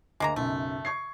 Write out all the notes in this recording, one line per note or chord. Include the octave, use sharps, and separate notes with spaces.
D2 G#3 A#3 A#5
B1 F#2 C#3 A3
C#6 G#6 C7